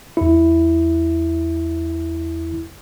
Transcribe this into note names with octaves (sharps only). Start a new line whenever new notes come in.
E2 E4